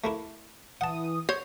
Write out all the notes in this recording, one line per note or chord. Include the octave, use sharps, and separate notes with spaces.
A3 A#3 E4
E3 F#5 A5 D#6
C5 C#5